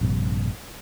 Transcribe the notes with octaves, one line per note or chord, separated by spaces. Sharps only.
A#1 G2 C3